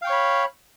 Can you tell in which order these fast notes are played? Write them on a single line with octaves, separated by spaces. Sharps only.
F5 G5 C#6 C#5 B5